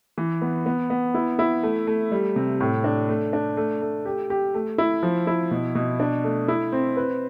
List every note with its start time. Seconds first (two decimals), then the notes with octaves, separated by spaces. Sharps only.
0.18 E3
0.42 B3
0.66 B3
0.90 B3
1.15 E4
1.39 E4
1.63 A3
1.87 A3
2.12 G3
2.36 C3
2.60 A2
2.84 D4
3.09 A3
3.33 D4
3.57 A3
3.81 A3
4.05 G4
4.30 G4
4.54 A3
4.78 E4
5.03 F3
5.27 E4
5.51 B2
5.75 B2
6.00 D4
6.24 A3
6.48 E4
6.72 C4
6.97 B4